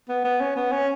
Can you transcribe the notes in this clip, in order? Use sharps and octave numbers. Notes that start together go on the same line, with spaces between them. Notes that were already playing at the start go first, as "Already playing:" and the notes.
B3
B3
C#4
B3
C#4